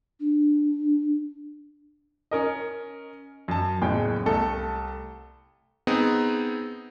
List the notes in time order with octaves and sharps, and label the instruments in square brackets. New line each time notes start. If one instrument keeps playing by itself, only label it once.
[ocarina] D4
[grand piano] C#4 A#4 D#5
F#2 A5
F#1 E2 A2 C#4 G#4 G5
C2 A3 A4
[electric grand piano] B3 C4 D#4 G#4